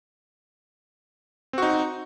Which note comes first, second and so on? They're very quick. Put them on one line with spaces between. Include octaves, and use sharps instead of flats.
C4 F#4 D#4